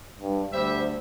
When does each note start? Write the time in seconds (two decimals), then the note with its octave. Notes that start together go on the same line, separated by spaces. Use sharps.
0.19 G2
0.53 D2 G3 C5 E5